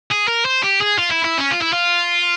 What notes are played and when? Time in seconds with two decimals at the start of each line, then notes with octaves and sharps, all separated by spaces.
0.11 G#4
0.27 A#4
0.45 C5
0.63 G4
0.81 G#4
0.98 F4
1.11 E4
1.24 E4
1.38 C#4
1.51 F4
1.62 E4
1.73 F4